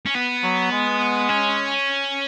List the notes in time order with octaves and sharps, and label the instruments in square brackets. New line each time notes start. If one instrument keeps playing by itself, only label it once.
[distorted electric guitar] C#4
B3
[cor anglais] F#3
G#3
[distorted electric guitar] C#4